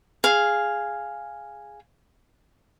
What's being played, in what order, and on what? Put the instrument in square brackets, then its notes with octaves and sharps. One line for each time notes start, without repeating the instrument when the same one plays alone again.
[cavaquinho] G#4 F5